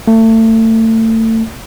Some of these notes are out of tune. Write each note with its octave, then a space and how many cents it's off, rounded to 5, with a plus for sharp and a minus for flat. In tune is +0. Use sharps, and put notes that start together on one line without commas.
A3 +30